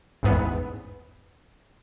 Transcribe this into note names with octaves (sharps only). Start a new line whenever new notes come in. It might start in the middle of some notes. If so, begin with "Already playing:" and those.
A1 E2 G#2 B3